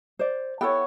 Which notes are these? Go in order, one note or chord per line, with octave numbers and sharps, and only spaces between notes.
C5 D5
B3 E4 A4 C#5 G5